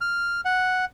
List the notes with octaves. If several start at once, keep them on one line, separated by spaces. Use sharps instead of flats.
F6
F#5